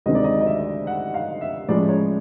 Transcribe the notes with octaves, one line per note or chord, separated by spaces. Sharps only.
D2 C3 D#3 G#3 C4 D#5
D5
D#5
D#5
E5
F#5
F5
E5
A2 F3 G#3 C#4 D5
C#5